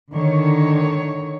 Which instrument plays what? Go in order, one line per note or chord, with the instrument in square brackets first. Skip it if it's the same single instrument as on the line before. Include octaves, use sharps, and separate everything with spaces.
[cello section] D3 D#3 C#5